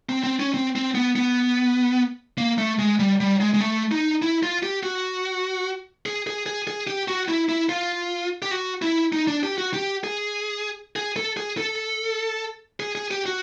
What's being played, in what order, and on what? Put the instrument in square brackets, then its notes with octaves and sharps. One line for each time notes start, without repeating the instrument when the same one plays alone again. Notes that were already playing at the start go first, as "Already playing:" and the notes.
[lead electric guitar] C4
C4
C#4
C4
C4
B3
B3
A#3
A3
G#3
G3
G3
G#3
G#3
A3
D#4
E4
F4
G4
F#4
G#4
G#4
G#4
G#4
G4
F#4
E4
E4
F4
G4
F#4
E4
D#4
D4
G4
F#4
G4
G#4
G#4
A4
G#4
A4
G#4
G#4
G4
F#4